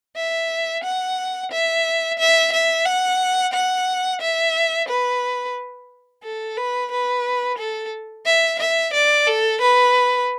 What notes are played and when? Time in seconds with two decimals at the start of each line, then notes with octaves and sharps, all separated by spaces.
0.16 E5
0.83 F#5
1.51 E5
2.19 E5
2.52 E5
2.86 F#5
3.53 F#5
4.21 E5
4.88 B4
6.23 A4
6.57 B4
6.91 B4
7.58 A4
8.25 E5
8.59 E5
8.93 D5
9.27 A4
9.61 B4